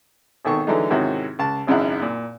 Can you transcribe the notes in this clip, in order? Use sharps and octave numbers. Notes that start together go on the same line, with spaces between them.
G#1 B2 D#3 A4 C#6
D3 E3 F#3 G#3 A3 D#4
G#2 C3 D#3 C#4 E4 F#4
C#2 A5
G#1 F#2 C#3 D#4 E4 F#5
A#2